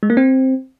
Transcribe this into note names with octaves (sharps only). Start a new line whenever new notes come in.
G#3
A#3
C4